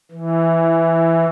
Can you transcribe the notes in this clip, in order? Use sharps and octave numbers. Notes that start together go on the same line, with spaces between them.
E3